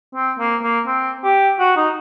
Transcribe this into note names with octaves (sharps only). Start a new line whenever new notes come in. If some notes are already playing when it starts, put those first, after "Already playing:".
C4
A#3
A#3
C4
G4
F#4
D#4